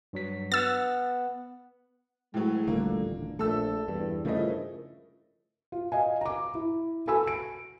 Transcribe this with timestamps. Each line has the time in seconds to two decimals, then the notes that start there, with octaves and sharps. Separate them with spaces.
0.13 G2 F#3 B6
0.52 B3 F#5 E6 A6
2.34 A2 E3 F#3 G#3
2.67 D#1 A1 A#2 D3 G3 A3 A#3
3.39 A#1 A3 A4 E6
3.88 E2 G2
4.25 G2 C#3 F3 A3 E4 F4 A#4 D#5
5.72 F4
5.92 D#5 F5 G#5
6.21 A#5 D6
6.55 E4
7.07 F#4 A4 G#5 B5 E6
7.27 D7